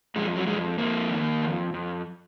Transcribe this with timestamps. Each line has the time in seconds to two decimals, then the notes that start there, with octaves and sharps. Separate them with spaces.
0.16 F2 G#3
0.36 F#3
0.47 F2 G#3
0.78 F2 A#3
1.10 D#3
1.42 F2
1.74 F2